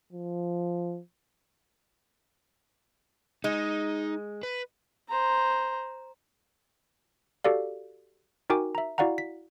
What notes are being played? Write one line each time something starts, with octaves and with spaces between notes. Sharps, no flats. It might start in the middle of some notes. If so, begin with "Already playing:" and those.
F3
G#3 D#4
B4
C5 A#5
F#4 G4 A4 D5 F5
D#4 F#4 A#4 G5 G#5 D6
E5 A#5
E4 F#4 D5 F5 F#5 A#5
B6